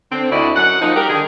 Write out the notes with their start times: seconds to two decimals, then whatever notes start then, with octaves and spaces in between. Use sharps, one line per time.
0.12 D3 C4
0.32 D2 E4 F#4 D5 D#5
0.56 F#2 F#5
0.82 F3 A#3 D#4
0.96 G3 G4 A#4
1.09 D3 D#3 G#4